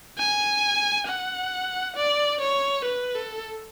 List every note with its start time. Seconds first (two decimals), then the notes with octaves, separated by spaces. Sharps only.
0.19 G#5
1.08 F#5
1.96 D5
2.41 C#5
2.85 B4
3.15 A4